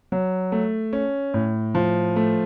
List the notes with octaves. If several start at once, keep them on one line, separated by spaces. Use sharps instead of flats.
F#3
A3
C#4
A2
F3
A3